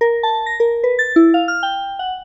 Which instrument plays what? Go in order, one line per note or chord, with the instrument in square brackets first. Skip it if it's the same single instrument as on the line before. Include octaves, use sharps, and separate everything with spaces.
[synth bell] A#4
A5
A#6
A#4
B4
A6
E4
F5
F6
G5
F#5